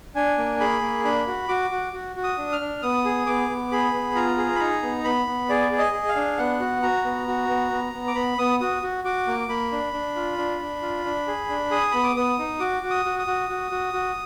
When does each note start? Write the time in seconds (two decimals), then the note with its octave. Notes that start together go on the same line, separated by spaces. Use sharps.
0.15 D4 G#5
0.38 A#3
0.60 G#4 B5
0.82 A#3
1.04 D4 B5
1.27 F#4
1.48 F#4 D6
1.71 F#4
1.93 F#4
2.16 F#4
2.24 D#6
2.37 D4
2.52 F6
2.61 D4
2.83 B3 D#6
3.05 G#4
3.26 B3 D6
3.50 B3
3.71 G#4 B5
3.94 B3
4.15 F4 A#5
4.37 G#4
4.55 B5
4.60 D#4 A#5
4.83 B3
5.04 B3 B5
5.27 B3
5.49 G#4 D5
5.72 G#4
5.79 D#5
5.93 G#4
6.09 F5
6.16 D4
6.38 B3 F#5
6.60 F#4
6.82 F#4 A#5
7.05 B3
7.28 F#4
7.49 B3
7.72 B3
7.94 B3
8.08 D6
8.15 B3 B5
8.38 B3 D#6
8.60 F#4 D#6
8.82 F#4
9.04 F#4 D6
9.27 A#3
9.49 A#3 B5
9.72 D4
9.93 D4
10.16 F4
10.38 D4
10.61 D4
10.82 F4
11.05 D4
11.28 G#4
11.49 D4
11.71 G#4 D#6
11.92 B3 B5
12.03 D6
12.16 B3 D#6
12.39 D#4
12.60 F#4 D6
12.83 F#4
12.90 D#6
13.05 F#4
13.19 D#6
13.27 F#4
13.49 F#4
13.71 F#4
13.93 F#4